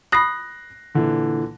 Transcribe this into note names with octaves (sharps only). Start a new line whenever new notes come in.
B5 D#6 F#6 A#6 C7
A#2 D3 E3